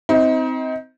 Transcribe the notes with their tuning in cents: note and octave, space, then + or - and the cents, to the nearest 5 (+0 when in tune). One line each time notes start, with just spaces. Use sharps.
C4 -10 D#4 +35